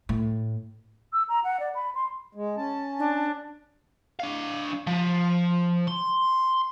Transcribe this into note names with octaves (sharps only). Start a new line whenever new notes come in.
A2
E6
A#5
F#5
D5
B5
C6
G#3
C#4 A5
D4
D4 F5
F3
C6